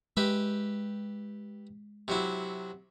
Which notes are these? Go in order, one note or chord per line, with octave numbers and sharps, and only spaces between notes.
G#3 G4 B4 E5
C3 F#3 E4